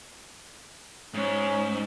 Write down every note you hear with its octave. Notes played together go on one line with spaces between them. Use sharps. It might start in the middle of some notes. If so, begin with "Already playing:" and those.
G#2 C#4